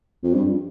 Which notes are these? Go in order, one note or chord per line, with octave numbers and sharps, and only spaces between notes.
F2
G2